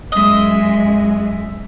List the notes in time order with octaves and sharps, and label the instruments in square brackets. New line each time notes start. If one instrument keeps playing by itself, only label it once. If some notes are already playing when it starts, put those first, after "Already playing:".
[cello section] F#2 G#3 [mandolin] D#5 E5